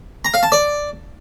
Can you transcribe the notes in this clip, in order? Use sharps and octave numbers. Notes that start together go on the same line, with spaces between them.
A#5
F5
A5
D5